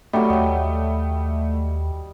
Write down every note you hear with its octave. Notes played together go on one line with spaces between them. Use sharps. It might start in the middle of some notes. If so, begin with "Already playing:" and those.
F#3 G3 A3
D#2 D#5 G5